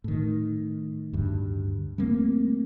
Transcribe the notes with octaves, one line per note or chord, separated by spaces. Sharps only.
A2 D#3
D2 G2
G3 A3 A#3 C4